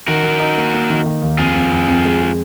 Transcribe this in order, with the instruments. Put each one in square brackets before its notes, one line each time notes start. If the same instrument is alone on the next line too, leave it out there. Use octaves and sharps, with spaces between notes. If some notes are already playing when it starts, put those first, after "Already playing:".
[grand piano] D#3 [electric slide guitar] F#4 A#4
[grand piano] D#3
D#4
A#3
A#3
D#3
D#3
D#2
[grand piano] F2 [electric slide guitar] F4 G#4
[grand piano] F2
F2
F2
G#3
G#3